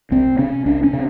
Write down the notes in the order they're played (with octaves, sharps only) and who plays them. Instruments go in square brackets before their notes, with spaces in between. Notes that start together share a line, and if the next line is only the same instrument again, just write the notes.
[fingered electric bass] C2 C4
C3 C#4
C2 D4
C#4
C3